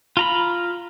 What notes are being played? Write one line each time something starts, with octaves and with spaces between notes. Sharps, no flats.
F4 A#5 B5